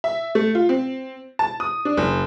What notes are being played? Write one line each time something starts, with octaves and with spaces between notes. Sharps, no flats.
E5
A3
F4
C4
A5
D#6
D4
F#1